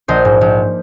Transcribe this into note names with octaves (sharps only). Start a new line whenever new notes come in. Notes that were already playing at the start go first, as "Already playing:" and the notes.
A#1 C5 D#5
G#2
A#1